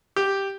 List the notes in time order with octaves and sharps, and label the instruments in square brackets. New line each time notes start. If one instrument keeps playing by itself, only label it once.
[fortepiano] G4